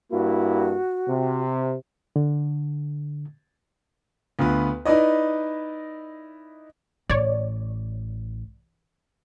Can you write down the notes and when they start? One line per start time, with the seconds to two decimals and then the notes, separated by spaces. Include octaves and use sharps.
0.11 G2 A#3 E4 F#4
1.08 C3
2.16 D3
4.39 D2 B3 F4 B4
4.85 D#4 E4 B4 D5 D#5
7.10 A1 C#5 D5